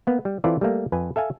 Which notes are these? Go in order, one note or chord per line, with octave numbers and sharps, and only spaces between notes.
A#3 B3
G3
E3 C4 E4 F4 A4 D5
G3 A3 A#3
F2 B4 G#5
A4 E5 F5 G#5 A5